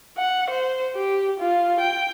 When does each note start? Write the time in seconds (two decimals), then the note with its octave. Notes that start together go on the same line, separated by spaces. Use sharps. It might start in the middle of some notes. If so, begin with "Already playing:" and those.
0.18 F#5
0.50 C5
0.95 G4
1.40 F4
1.79 G5